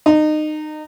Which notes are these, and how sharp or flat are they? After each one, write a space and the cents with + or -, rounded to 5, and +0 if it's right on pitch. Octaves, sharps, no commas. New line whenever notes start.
D#4 -25